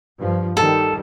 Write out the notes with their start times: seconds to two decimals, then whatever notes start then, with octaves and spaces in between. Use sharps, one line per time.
0.19 G2 F3
0.57 D#3 G3 A4